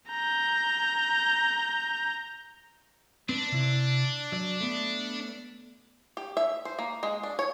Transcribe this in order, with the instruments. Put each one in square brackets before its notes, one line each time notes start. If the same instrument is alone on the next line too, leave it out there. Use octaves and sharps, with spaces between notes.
[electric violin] A#5 G6
[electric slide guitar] C4 B4 [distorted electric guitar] D4
[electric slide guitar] C3 E4
F#3 D5
A3 B3
[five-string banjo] G4
E5
C5
A#3
G#3
D4
C#5